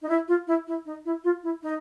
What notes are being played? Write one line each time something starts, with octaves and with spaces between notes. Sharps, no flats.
D#4
E4
F4
E4
E4
D#4
E4
F4
E4
D#4